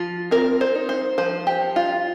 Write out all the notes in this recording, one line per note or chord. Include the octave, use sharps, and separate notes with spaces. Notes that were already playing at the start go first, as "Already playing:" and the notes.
Already playing: F3 F4
C4 A#4
C5
D#4
C5
F3 C5
G4
F3
F4